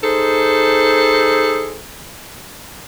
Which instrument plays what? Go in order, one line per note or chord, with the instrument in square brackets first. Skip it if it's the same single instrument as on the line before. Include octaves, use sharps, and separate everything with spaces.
[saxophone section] D#4 G#4 A4 C5